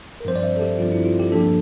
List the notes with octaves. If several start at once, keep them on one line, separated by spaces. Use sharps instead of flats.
A#4
G2 F3 C4 C5
D5
E5
A4
G4
G2 F3 C4 F4
E4
F4
G4
G2 F3 A#3 D4 A4